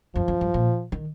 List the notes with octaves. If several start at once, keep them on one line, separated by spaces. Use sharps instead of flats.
F2 F3
F2
G2
A#2
D#3